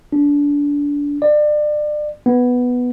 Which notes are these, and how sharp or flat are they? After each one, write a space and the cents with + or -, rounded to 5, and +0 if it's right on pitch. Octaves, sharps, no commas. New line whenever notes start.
D4 -25
D5 +30
B3 +0